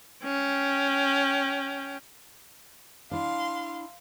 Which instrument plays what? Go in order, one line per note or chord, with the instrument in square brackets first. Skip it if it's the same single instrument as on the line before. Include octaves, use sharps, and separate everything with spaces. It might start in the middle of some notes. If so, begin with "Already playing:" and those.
[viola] C#4 G5
[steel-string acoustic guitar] D4 E4 [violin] F5 C6